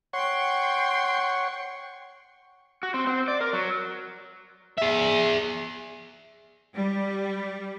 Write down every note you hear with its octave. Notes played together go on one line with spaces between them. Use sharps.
C#5 F#5 G5 C6 C#6
F#4
C4
C4
D5
A#4
F#3
G#4 E5
G3